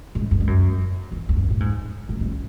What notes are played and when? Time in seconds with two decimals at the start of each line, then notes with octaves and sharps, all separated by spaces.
0.15 G#2
0.31 F#2
0.40 G#2
0.47 F#2
1.12 E2
1.29 E2
1.36 F#2
1.50 A2
1.60 G#2
2.09 A2
2.21 D#3
2.26 C#3